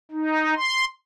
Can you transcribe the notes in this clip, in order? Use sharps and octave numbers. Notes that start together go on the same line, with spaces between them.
D#4
C6